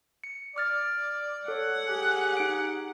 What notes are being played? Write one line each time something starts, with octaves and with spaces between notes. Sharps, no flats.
C#7
D5 D6 F6 A6
A4 C#5 F#5
G4 G#4
D#4 C#7 D7